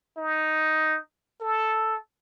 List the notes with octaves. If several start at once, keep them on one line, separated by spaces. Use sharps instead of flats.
D#4
A4